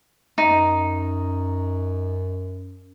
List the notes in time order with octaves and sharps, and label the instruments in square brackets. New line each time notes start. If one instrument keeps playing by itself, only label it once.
[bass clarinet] F#2 [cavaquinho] D#4